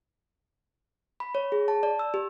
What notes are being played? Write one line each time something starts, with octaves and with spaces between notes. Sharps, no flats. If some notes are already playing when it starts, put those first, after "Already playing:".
B5
C#5
G#4
A5
D5
E6
G4